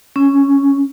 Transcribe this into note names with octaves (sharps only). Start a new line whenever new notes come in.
C#4